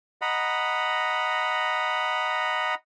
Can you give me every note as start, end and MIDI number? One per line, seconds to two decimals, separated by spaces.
0.22 2.75 75
0.22 2.75 78
0.22 2.75 82
0.22 2.75 83